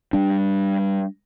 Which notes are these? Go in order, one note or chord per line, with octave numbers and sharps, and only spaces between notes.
G3 D4